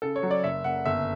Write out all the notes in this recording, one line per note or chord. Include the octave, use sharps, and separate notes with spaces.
C#3 A4
C#5
F#3
D5
F#1 E5
F#1 F#5
G1 E5